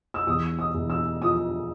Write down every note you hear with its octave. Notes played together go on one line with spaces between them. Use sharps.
E6
E2 D#6
D#6
E2
E6
F3 D#6